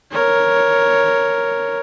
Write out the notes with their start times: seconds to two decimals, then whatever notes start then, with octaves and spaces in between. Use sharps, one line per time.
0.12 A#4 C#5